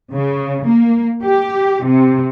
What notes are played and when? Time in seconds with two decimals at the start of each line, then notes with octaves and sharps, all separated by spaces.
0.13 C#3
0.66 A#3
1.22 G4
1.84 C3